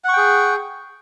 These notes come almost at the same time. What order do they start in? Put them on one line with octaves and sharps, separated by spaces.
F#5 C#6 G5 G#4